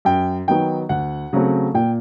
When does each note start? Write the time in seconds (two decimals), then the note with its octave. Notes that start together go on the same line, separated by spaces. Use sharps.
0.05 F#2 G5
0.47 D#3 F#3 B3 G5
0.89 D2 F#5
1.33 C#3 F#3 A3 C4
1.74 A#2 G5